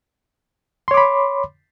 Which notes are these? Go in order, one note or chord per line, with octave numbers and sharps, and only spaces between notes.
C#5 B5 C6 D6